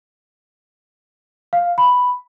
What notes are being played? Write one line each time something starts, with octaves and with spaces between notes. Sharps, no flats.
F5
B5